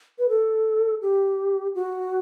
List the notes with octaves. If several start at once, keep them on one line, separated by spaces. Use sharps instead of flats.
B4
A4
G4
F#4